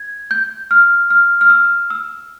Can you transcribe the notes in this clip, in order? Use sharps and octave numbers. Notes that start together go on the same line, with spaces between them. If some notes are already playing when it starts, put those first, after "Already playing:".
Already playing: G#6
G6
F6
F6
F6
E6
E6